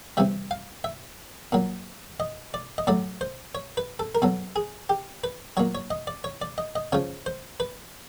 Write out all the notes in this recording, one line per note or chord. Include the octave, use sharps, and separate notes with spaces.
C3 E3 G3 E5
F5
E5
A#2 F#3
D#5
D5
D#5
A2 F#3 D5
C5
C#5
B4
A4
A#4
B2 F#3 A4
G#4
G4
B4
A#2 F#3 C#5
C#5
D#5
D5
C#5
D5
D#5
D#5
C#3 F3 C#5
C5
B4